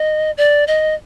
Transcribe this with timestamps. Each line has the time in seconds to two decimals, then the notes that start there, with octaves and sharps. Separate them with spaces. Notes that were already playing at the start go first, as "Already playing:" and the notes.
Already playing: D#5
0.38 D5
0.67 D#5